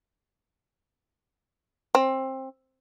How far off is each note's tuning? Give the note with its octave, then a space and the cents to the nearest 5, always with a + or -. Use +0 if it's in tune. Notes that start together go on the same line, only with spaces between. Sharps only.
C4 +20